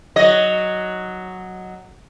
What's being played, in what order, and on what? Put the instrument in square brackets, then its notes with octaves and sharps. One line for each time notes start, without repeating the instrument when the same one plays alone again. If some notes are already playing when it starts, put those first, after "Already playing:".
[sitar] F#3 D#5